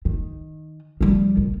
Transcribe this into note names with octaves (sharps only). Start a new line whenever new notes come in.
D#3
F3 G3
A#1